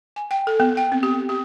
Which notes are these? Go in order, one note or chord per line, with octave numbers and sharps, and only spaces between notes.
G#5
G5
A4
B3
G5
C4
G4
G4